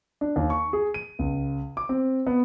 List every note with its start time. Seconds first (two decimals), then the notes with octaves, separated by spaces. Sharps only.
0.21 D4
0.36 D#2
0.50 C#6
0.73 G#4
0.94 D#7
1.19 C#2
1.77 D6
1.89 C4
2.27 B3